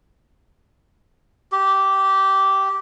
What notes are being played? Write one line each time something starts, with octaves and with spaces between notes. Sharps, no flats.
G4